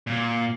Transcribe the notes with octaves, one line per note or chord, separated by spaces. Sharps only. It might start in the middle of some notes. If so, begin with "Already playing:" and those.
A#2